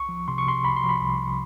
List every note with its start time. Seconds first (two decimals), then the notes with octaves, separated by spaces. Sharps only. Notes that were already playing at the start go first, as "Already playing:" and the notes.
Already playing: C2 C#6
0.09 F3
0.28 C3 C6
0.38 C#6
0.46 C3 C6
0.65 C2 B5
0.76 C6
0.84 F3
0.89 B5
1.02 C2